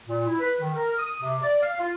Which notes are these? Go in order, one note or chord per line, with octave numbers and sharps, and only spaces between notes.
A#2
E4
B4
D#3
A#4
D#6
C3
D5
F5
F4